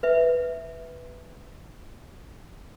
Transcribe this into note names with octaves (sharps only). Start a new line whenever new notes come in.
B4 E5